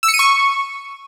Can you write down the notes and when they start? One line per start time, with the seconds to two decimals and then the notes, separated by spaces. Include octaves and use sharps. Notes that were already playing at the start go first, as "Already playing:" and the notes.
0.03 E6
0.08 C#7
0.14 D#7
0.19 C#6